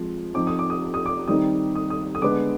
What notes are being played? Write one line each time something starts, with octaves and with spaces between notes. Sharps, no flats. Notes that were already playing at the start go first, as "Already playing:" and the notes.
Already playing: F3 G#3 C4
F3 C4 D#4 D6
D#6
D6
D#6
D6
D#6
D6
D#3 G3 C4 D#4 D#6
D#6
D#6
D#6
D3 G#3 B3 D6